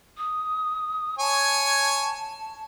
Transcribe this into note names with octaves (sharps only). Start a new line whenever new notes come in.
D#6
C#5 G#5 A5